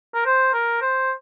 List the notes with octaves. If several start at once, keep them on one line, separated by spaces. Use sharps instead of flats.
A#4
C5
A#4
C5